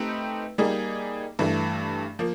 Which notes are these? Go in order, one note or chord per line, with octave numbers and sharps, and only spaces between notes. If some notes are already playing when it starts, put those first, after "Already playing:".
Already playing: A3 C4 D#4 G4 B4
G3 A#3 D#4 G#4
G2 E3 A3
F3 A#3